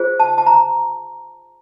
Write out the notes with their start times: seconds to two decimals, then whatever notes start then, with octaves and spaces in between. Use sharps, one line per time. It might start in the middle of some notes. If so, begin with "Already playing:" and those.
Already playing: F4 G#4 C5
0.20 A5
0.38 A5
0.46 A#5